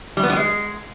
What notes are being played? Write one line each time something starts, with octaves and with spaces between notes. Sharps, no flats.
G3
B3
G3
G#3